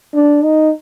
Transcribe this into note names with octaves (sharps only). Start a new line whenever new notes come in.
D4
D#4